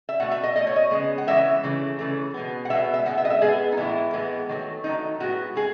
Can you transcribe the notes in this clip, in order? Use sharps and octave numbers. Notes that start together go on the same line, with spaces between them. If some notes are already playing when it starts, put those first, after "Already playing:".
E5
B2 A3 F#5
E5
D#5
B2 A3 D#5
C#5
D#5
C#3 E3 G#3 B3
F#5
C#3 E3 G#3 B3 E5
C#3 E3 A3
C#3 E3 A3
B2 G#3 B3
F#5
B2 G#3 B3 E5
E5
A2 G#3 B3 F#5
E5
D#5
E5
A2 G#3 B3 G#4
D#4
A2 E3 G#3 B3 E4
A2 E3 G#3 B3
D#3 F#3 A3
D#3 F#3 A3 D#4
A2 G#3 B3 F#4
A2 G#3 G#4